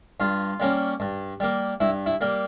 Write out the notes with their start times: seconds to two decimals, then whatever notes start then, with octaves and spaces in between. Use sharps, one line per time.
0.20 G2 F4
0.60 G3 A#3 C#4
1.00 G2
1.40 G3 A#3
1.80 G2 E4
2.06 E4
2.21 G3 A#3